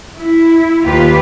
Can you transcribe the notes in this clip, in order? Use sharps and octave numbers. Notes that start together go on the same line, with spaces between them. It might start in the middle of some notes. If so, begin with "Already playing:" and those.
E4
D#2 F4 G4 B4